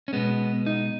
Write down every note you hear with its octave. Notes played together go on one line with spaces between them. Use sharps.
C#4
B2 G#3 B3
D#4